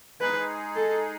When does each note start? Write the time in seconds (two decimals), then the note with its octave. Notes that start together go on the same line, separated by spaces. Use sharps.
0.20 G#3 D#4 G#4 B4
0.75 A4